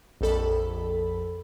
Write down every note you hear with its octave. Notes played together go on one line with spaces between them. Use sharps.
A#1 F2 A4 B5